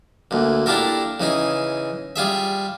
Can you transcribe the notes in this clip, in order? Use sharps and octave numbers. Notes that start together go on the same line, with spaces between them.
D2 A#2
D4 E4 F4 G4 A4 A#4
C#3 E3 D#4 G#4
G3 F4 G#4 E5